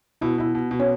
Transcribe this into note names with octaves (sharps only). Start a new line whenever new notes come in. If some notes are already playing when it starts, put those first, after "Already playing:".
B2 E4
B2 E4
B2
B2
C#4